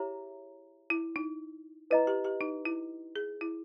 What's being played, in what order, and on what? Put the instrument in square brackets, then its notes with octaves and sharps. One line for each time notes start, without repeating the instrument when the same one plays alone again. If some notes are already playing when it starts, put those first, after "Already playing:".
Already playing: [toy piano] E4 G#4 C#5 E5 A#5 [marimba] G4
[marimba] E4
D#4
[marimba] E4 [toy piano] B4 D#5 A#5
[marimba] G4
G4
D#4
E4
G#4
E4